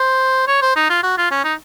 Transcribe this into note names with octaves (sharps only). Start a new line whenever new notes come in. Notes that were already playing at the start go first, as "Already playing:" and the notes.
Already playing: C5
C#5
C5
D#4
F4
F#4
F4
C#4
D#4